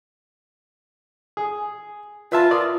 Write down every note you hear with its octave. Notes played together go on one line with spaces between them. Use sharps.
G#4
F4 B4 E5 A5
A#4 D5 D#6